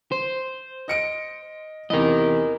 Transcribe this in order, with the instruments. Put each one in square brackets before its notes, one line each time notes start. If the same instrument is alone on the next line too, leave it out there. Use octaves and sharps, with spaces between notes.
[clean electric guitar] C5
[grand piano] D#5 C#7 D7
[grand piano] E2 C3 [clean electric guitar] A#4 D#5